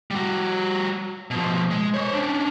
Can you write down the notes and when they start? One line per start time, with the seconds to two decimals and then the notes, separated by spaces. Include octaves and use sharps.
0.11 G3 F#4
1.31 B2 F3
1.71 G#3
1.94 C5 C#5
2.13 C#4 D4